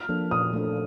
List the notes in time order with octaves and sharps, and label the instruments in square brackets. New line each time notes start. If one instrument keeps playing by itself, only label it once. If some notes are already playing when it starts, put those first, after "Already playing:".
Already playing: [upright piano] F6
[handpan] F3 A#3 D4 A4
[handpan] A#2 [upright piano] D#6
[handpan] A3 D4 A4